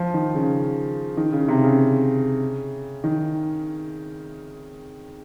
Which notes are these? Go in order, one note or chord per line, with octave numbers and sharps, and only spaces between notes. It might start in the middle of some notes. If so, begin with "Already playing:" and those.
Already playing: F3
D#3
C#3
D#3
C#3
C3
C#3
D#3